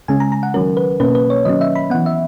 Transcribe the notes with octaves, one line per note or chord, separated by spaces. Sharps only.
C#3 G#3 C#4 G#5
A#5
A#5
F#5
D#3 F#3 C#4 A#4
B4
B2 A#3 C#4 B4
B4
C#5
D#3 F#3 C#4 D#5
E5
B5
E3 B3 F#5
E5